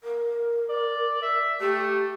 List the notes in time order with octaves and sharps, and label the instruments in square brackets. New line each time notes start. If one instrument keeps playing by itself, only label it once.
[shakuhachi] A#4
[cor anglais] D5
E5
[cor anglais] A3 [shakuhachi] G4